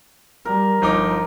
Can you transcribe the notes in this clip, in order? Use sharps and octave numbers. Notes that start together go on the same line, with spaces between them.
G3 A#4
G1 F3 D#4 D6